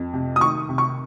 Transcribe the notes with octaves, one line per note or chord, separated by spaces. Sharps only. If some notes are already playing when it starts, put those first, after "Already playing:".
Already playing: F2
C3
D#6
D#3 C#6
C3
C#6